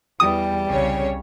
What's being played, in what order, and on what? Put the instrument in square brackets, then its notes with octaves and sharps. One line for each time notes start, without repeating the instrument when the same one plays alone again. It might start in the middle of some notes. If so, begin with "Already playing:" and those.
[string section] E2 [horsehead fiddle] G3 [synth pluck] D#6
[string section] C2 C#3 C#5